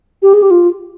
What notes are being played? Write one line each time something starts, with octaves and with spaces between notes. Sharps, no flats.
G4
G#4
G4
F4